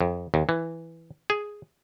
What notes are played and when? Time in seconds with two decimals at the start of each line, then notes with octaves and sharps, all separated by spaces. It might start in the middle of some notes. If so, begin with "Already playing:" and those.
0.01 F2
0.34 D#2
0.49 E3
1.30 G#4